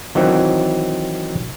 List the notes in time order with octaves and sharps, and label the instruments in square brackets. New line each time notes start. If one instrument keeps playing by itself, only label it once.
[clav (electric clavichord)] D#3 E3 F#3 C4